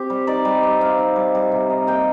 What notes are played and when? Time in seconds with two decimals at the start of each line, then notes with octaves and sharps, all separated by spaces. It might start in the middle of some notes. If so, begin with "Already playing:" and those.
Already playing: C4 G4
0.10 G3
0.27 D#4 D5
0.45 G3
0.63 C4
0.81 C4 F5
0.99 D#4
1.16 G3
1.35 G3
1.52 C3
1.70 D#4
1.87 A#3 G5